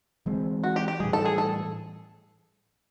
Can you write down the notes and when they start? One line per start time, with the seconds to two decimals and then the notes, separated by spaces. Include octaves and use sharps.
0.26 E3 G#3 C4
0.64 F#4
0.76 G4
0.88 G4
1.00 A2 E3 G3 G#4
1.13 A4
1.25 G#4
1.38 A4